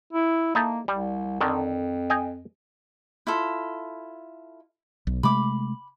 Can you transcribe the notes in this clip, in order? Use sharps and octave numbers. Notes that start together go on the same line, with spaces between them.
E4
A#3 D#4 E4 A4
C2 G3
F2 D3 D#3
D#5 G5 G#5
E4 F4 A4
B1
C3 G#3 A3 B5 D6